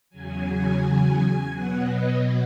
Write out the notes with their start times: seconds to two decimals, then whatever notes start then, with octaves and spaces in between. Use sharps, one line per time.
0.10 E2 C#3 F#3 G#5
0.46 G#5
0.80 G#5
1.15 G#5
1.50 B2 F#3 B3 F#5
1.84 D#5